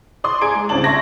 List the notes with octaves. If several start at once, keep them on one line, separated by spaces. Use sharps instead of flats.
D5 C6 D#6
G#4 G#5 A#5 G#6 D7
G#3
C2 C#3 D4 C5 A5 F#7
E5 A5 C6 C#6 G#6 A#6